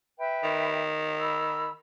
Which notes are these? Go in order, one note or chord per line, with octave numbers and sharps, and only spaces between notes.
B4 E5 G5
D#3
B5 E6